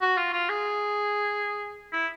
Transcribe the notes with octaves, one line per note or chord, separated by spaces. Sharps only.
F#4
F4
F4
G#4
E4